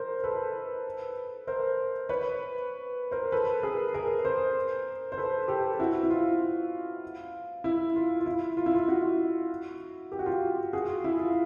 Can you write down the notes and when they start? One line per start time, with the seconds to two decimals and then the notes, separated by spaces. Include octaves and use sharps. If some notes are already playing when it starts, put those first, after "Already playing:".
Already playing: A#4 C5
0.24 A4 B4
1.47 A#4 C5
2.09 B4 C#5
3.11 A#4 C5
3.32 A4 B4
3.63 G#4 A#4
3.94 G#4 A#4
4.25 A#4 C5
5.12 C5
5.18 A4 B4
5.48 G4 A4
5.79 E4 F#4
6.03 E4
6.11 F4
7.64 E4
7.96 F4
8.20 F4
8.26 E4
8.57 F4
8.66 E4
8.75 F4
8.88 E4 F#4
10.12 G4
10.19 F#4
10.26 F4 G4
10.73 F#4 G#4
10.88 F4
11.04 E4
11.19 F4